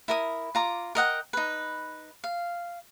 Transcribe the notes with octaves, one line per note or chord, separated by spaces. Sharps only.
E4 A#4 D#6
F4 A#5 D6
A#4 D#5 F#5 G5
D#4 B4
F5